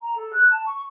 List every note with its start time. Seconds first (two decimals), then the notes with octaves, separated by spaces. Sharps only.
0.01 A#5
0.15 A4
0.33 F#6
0.49 A5
0.66 C#6